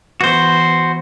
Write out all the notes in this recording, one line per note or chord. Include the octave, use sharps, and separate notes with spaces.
E3 B3 F#4 C5